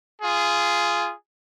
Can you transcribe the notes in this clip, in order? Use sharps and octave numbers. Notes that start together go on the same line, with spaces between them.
F4 G#4